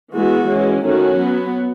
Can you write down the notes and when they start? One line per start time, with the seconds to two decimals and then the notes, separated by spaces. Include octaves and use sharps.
0.14 E3 G#3 B3 F#4
0.48 E3 G#3 C#4
0.83 D#3 A3 C#4 F#4
1.17 F#3 B3